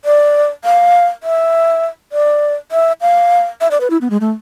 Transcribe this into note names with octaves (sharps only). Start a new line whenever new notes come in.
D5
F5
E5
D5
E5
F5
E5
D5
B4
E4
B3
G#3
A3